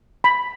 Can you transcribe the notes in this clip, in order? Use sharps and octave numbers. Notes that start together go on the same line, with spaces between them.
B5